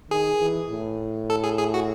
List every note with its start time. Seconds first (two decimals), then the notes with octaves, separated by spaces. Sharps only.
0.10 D#3 G#4
0.40 E3
0.70 A2
1.30 A4
1.44 G#4
1.58 G#4
1.74 F#4